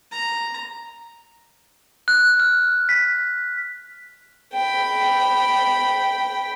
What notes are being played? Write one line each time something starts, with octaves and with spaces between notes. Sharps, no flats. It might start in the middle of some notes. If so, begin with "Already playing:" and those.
A#5
F#6
F6
B6
G5 B5